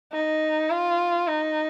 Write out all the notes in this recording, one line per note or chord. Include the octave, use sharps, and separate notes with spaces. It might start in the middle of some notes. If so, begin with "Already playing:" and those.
D#4
F4
D#4